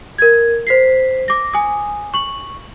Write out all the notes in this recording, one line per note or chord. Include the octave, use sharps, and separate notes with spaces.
A#4 G#6
C5 B6 C7
D6 A#6
G#5 D#6
C#6 F#7